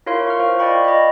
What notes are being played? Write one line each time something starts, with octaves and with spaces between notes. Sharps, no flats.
E4 F4 A#4 C#5 F5 C6
C#6 F6
F4 C5 F5
D5 D#5 G5 B5 C#6
D#5 B5